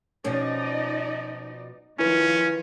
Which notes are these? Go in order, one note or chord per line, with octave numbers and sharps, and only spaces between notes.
B2 F3 C#4 D#4 D5 D#5
D#3 F3 C#4 E4 F4 B4